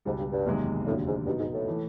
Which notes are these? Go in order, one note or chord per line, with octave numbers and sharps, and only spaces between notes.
C#2 G#2 B2 G3
G2
G2
F#1 E2 C3 D#3 G#3
F1 D#2 A2 D3 F#3
G#2
G2 B2 F#3 B3 D#4
G#2
A2
E3 A3